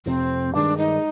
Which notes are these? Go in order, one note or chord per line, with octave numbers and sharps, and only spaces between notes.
F1 F2 C3 C4
G2 D#3 G#3 D4
D#4